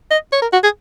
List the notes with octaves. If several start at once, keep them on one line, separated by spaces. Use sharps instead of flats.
D#5
C#5
A#4
F#4
G#4